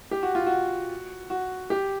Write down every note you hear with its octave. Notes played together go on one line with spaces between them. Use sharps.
G4
F#4
F4
F#4
F#4
G4